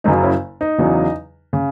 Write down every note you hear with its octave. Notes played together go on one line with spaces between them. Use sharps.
F#1 F#2 C#3 F#3 D#4
C#4 E4
D#4
E2 C#3 F#3
C#3